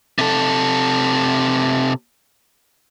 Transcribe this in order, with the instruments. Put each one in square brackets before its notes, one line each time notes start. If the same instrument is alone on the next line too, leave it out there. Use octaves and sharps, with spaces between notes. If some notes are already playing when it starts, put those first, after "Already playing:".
[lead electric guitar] C3 A4